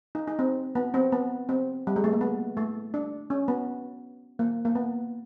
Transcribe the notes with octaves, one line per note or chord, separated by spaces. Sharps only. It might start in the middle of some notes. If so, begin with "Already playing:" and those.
D#4
D#4
C4
B3
C4
B3
C4
G3
G#3
A3
A#3
B3
A3
D4
C#4
B3
A#3
A#3
B3